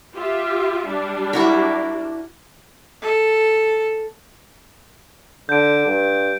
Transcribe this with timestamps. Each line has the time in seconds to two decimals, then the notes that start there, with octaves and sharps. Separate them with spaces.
0.13 F4 G4 E5
0.87 G3 D4
1.33 E4 F#4 A#4
3.02 A4
5.49 D3 G6 D7
5.86 G2